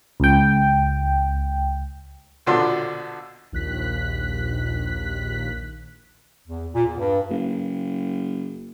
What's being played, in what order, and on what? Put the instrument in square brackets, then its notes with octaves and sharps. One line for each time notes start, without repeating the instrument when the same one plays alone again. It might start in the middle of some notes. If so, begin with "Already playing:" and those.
[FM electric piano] C#2 G5
[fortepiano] A#1 B2 D3 F3 D4 C6
[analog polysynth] A#1 D#2 F#6 B6
[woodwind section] E2
A#2
E2
G2
[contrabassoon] F#1